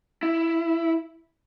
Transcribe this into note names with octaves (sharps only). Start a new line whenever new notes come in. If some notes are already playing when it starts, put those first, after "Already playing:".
E4